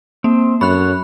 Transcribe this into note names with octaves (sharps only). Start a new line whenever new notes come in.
A#3 C4
F#2 A4 C#5 F#5 B5 F#6